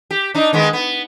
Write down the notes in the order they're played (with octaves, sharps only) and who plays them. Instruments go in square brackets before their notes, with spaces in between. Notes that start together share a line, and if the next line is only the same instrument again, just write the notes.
[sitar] G4
D4 D#4
D#3 G#3 B3
B3